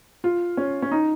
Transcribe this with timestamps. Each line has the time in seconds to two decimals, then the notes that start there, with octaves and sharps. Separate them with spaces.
0.24 F4
0.57 C#4
0.82 C#4
0.91 D#4